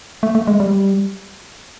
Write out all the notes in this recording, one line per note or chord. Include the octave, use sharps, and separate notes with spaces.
A3
A3
G#3
G3